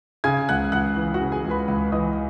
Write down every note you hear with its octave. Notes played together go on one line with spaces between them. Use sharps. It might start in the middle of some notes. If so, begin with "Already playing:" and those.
C#3 G#5 G#6
C#2 F#5 F#6
C#2 F#5 F#6
E3
F#4 F#5
C#3
G#4 G#5
C#2
B4 B5
C#2
E3 D#5 D#6